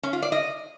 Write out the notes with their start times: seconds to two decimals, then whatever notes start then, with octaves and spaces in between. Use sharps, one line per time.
0.03 C#4
0.13 F4
0.22 D5
0.32 D#5